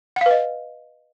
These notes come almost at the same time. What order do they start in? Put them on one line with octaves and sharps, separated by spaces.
F#5 F5 B4 D#5